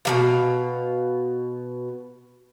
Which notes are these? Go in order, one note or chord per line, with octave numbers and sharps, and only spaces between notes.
B2 G3 F5